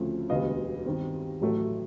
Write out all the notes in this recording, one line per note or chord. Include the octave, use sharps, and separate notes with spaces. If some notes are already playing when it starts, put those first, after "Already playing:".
Already playing: D2 C#3 F3 A3 C4
E1 D2 D3 G3 B3 D#5 F5
G2 D#3 G3 C4
A1 A2 F#3 A3